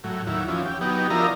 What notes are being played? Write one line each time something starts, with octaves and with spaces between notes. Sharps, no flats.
A2 F#3
D#2 F#3 E4
E3 F3 C#4
G4
F#3 B3 D#4 G4
F3 D4 E4 A#4 D#5 A#5